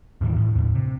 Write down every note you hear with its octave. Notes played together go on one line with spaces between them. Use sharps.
D#2 A2 D#3 E3
A2
D#2 A2
C3